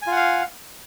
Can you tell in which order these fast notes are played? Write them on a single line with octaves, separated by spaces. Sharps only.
G#5 F4 F#5 F5